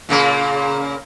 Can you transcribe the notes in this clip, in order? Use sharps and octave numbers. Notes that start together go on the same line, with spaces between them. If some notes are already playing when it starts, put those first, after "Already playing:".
A#2 C#3 A#3